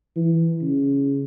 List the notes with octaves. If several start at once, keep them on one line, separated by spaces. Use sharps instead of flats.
E3
C#3